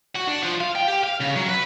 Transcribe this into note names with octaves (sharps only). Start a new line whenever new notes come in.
F#4
D4
F3
F5
G5
G4
F5
C#3
F#3
B4